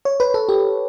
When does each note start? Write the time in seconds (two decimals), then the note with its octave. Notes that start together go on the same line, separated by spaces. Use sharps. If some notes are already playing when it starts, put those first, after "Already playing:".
0.05 C#5
0.20 B4
0.34 A4
0.49 G4